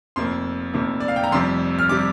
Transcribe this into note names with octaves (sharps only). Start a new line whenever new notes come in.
F1 F2 C3 A#3 C6
F1 F2 C3 A#3
D5
F5
G5
A#5
F1 F2 C3 G3 C6
F6
C3 G3 D6